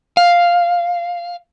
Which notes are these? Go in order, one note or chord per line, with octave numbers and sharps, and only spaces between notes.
F5